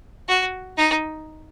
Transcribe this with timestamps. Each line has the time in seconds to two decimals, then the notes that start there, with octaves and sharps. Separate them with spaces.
0.28 F#4
0.78 D#4